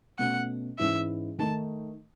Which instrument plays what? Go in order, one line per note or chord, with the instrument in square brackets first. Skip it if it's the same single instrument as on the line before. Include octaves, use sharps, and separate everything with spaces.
[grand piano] B2 A3 C#4 [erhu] F#5
[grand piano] G#2 E3 G#3 C#4 E4 [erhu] E5
[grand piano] D#3 A3 D#4 [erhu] A5